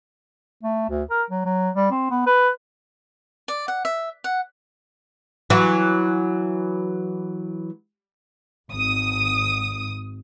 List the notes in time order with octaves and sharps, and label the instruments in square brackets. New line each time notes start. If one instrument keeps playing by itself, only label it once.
[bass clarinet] A3
D2
A#4
F#3
F#3
G3
C4
B3
B4
[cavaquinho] D5
F#5
E5
F#5
[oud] E3 F#3
[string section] G#1 D#6